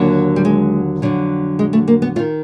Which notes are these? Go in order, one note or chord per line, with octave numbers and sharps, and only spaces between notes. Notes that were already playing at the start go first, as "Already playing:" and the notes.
Already playing: D#2 D3 F#3
G3
G#3
F2 D3 F#3
G#3
A3
A#3
B3
F#3 F4
D#3